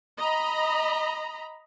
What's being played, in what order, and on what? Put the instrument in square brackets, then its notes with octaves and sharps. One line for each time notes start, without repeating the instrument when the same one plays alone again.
[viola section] D#5 A#5 B5